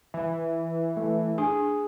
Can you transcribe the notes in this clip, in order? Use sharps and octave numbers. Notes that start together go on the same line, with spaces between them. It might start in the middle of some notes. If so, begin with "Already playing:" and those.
E3
A3
D4 G#4